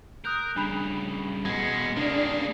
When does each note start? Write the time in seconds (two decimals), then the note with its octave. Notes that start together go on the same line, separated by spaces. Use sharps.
0.25 A#4 D#6 F#6 G6
0.56 G2 C#3 D4 B5 F7
1.45 B2 G#3 B3 G#6
1.97 C#3 G3 A#3 D4 G#4